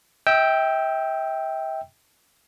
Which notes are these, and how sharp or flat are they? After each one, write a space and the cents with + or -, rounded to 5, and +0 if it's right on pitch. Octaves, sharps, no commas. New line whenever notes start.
E5 -40 G5 +0 E6 +0